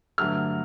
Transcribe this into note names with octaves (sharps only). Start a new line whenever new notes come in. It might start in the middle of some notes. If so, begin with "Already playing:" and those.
G2 D3 F#3 A3 F6